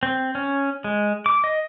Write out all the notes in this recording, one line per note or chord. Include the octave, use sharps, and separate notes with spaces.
C4
C#4
G#3
D6
D#5